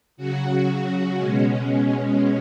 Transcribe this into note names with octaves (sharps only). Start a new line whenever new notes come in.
C#3 F#3 F#4
B2 G#3 C#4